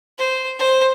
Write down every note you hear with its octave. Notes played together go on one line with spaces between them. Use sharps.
C5
C5